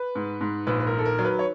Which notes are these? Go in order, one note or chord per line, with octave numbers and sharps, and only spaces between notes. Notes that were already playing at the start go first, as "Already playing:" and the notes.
Already playing: B4
G#2
G#2
A#1 B4
B4
A#4
D#3
A4
A#4
F#3
B4
C#5